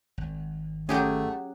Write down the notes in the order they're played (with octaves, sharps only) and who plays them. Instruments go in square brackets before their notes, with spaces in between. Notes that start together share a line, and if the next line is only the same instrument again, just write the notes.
[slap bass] G#1
[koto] F#3 G4 G#4 [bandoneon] A3 [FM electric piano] C#4 F#5